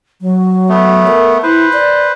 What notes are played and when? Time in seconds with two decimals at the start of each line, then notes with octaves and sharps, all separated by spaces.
0.21 F#3
0.69 A3 B3
1.07 A#4
1.43 E4 B4 C5
1.73 D5